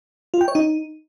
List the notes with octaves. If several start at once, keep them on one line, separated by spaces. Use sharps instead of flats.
F4
G5
C#5
D#4